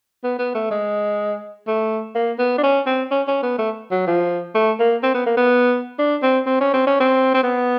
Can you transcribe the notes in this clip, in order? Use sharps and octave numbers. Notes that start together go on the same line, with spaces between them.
B3
B3
A3
G#3
A3
A#3
B3
D4
C#4
C4
C#4
C#4
B3
A3
F#3
F3
A3
A#3
C4
B3
A#3
B3
D4
C4
C4
C#4
C4
C#4
C4
C4
B3